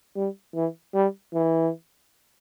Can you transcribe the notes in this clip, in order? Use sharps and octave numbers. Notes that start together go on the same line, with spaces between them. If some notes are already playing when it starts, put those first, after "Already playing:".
G3
E3
G3
E3